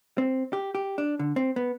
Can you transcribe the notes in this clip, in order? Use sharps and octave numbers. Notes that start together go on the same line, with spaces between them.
C4
G4
G4
D4
D3
C4
B3